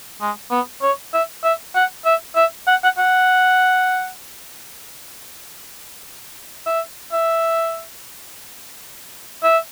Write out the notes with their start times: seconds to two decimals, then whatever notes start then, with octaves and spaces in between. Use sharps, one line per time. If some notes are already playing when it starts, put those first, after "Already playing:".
0.21 G#3
0.51 B3
0.82 C#5
1.13 E5
1.43 E5
1.75 F#5
2.05 E5
2.36 E5
2.67 F#5
2.84 F#5
2.98 F#5
6.66 E5
7.13 E5
9.44 E5